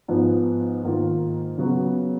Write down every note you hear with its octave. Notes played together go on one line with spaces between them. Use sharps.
G#2 F3 B3
G#2 D#3 A#3 F4
C#3 F#3 B3 F#4